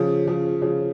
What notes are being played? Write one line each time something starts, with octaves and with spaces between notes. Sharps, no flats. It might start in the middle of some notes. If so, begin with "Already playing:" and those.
Already playing: C#3 F3
C#3 F3
C#3 F3